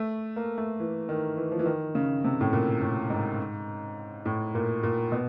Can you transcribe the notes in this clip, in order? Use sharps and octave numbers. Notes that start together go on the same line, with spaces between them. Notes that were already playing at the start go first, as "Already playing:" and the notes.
Already playing: A3
A#3
A3
E3
D#3
E3
F3
E3
D#3
C#3
C3
A2
A#2
A2
G#2
A2
A#2
A#2
B2